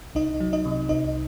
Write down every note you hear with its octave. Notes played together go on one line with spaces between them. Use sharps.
C2 D#4 D#5
F#3
D#4 D#5
C3
C2 D#4 D#5